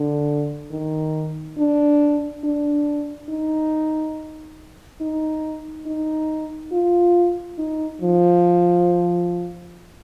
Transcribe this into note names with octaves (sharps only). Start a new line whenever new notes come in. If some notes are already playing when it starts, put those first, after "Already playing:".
Already playing: D3
D#3
D4
D4
D#4
D#4
D#4
F4
D#4
F3